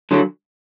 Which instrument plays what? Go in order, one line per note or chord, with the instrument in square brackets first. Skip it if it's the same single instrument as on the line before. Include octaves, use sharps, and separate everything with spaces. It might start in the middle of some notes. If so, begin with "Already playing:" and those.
[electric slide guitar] D3 F#3